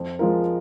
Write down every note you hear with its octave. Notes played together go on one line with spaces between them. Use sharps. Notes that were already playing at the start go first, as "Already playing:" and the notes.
Already playing: F2
F3 G#3 F4 A#4